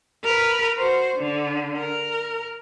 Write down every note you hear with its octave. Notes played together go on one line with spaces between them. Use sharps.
A#4 B4
F#4 C5
D3
A#4